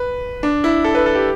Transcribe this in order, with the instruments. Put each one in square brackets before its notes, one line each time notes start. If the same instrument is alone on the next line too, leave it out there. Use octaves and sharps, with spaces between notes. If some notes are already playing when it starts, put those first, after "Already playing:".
Already playing: [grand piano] B4
D4
E4
A4
B4
A4
G4